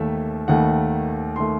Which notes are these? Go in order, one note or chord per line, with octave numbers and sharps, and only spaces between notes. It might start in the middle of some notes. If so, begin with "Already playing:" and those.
Already playing: D#2 D#3 A3 E5
D#2 D#3 A3 F#5
D#3 A3 C6